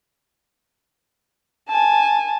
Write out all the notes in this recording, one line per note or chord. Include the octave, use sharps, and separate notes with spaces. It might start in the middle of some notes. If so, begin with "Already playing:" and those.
G#5 A5